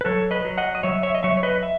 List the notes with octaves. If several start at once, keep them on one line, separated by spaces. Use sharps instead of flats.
B4
F#3 A4 C#5
B4 D#5
F#3
D#5 F#5
D#5
F#3 C#5 E5
C#5 E5
D#5
F#3 C#5 E5
C#5
B4 D#5
E5